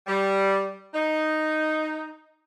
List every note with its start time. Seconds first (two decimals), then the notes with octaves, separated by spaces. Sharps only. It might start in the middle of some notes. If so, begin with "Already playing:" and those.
0.07 G3
0.94 D#4